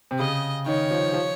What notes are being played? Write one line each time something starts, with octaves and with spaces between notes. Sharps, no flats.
C3
C#3 D#5
D#3 C#5
F3
F3